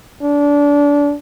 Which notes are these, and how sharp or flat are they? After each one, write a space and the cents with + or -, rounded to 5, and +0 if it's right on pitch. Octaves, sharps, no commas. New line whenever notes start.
D4 -25